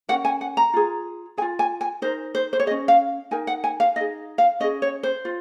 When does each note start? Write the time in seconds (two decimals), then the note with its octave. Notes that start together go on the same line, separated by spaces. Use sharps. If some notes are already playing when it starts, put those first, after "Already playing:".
0.09 C#4 F#4 A#4 F#5
0.25 G#5
0.41 F#5
0.57 A#5
0.74 F4 G#4
1.38 G#4 G#5
1.42 F4
1.59 G#5
1.81 G#5
2.02 D#4 A#4 C5
2.35 C5
2.53 C5
2.60 C#5
2.66 G#4 D#5
2.71 C#4
2.88 F5
3.31 D#4 A#4 G#5
3.47 F#5
3.64 G#5
3.80 F5
3.96 D#4 G#4 D#5
4.38 F5
4.60 C#4 D#5
4.64 G#4
4.82 C#5
5.03 C5
5.25 F4